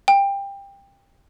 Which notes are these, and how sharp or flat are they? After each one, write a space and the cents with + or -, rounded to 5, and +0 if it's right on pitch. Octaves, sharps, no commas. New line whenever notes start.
G5 +20